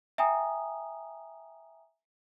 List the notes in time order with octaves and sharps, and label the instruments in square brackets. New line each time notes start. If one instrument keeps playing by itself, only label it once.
[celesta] E5 G5 G#5 A#5 D#6